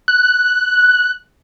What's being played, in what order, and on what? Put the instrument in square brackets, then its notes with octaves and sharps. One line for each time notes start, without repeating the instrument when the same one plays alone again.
[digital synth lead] F#6